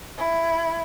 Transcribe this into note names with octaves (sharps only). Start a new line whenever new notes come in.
E4